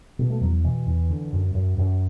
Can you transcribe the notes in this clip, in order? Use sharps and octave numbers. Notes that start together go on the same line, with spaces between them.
B2
A3
E2 F#3
B2 E3
E2
D3
F#2
F#2
F#2